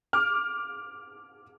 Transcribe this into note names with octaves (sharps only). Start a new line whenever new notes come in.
D6 F6